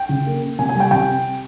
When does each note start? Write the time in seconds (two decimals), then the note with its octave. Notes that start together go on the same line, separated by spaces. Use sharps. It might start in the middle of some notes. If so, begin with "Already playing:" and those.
Already playing: G5
0.09 C#3
0.26 A#3
0.43 A#3
0.59 C3 G#5
0.69 G#5
0.76 G3 G5
0.91 C3 G5